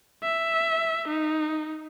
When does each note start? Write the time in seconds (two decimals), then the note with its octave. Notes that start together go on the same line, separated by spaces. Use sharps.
0.23 E5
1.08 D#4